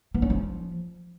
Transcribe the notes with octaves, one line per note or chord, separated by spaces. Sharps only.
B3
C#4
F3